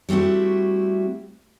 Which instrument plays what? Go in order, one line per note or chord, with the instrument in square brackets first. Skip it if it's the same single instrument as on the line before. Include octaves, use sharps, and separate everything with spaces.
[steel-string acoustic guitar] G3 A3 C4 E4 F#4